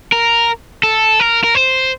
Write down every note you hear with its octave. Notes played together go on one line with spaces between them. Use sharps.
A#4
A4
A#4
A#4
C5